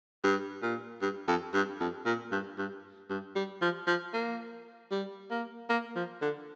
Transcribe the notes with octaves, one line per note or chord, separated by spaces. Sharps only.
G2
A#2
G2
F2
G2
F2
A#2
G2
G2
G2
G3
F3
F3
A#3
G3
A#3
A#3
F3
D3